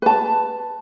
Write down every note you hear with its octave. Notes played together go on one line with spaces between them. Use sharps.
B4 A5